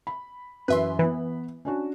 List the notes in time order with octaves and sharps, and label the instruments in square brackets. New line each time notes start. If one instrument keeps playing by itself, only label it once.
[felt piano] B5
[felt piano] F#2 E3 [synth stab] B4 E5 C6
[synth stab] E3 [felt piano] B3 B5
[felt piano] C#4 D4 F#4